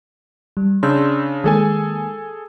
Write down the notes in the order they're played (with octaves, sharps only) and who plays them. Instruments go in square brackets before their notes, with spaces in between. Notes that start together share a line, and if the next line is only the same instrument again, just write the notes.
[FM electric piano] G3
[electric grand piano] C#3 D4 [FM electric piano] C6 E6 G6
[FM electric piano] D#3 G#3 A#3 [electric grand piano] G#4 A4 G#5